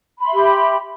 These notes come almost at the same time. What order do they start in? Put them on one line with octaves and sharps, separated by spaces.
B5 C6 E5 G4